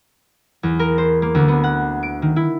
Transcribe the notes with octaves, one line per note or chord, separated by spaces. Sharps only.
E2
A#4
C5
A#3
D2
B3
F#5
D7
D#3
E4